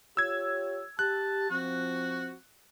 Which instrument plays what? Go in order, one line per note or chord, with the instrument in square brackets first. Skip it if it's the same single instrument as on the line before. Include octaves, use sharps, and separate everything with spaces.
[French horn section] F4 G4 C#5 [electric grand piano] E6 G#6
[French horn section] G4 [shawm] A5 [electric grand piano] F#6
[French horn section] F3 C4 [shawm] F#4